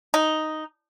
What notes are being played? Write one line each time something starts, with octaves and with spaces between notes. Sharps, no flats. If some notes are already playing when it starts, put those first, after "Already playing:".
D#4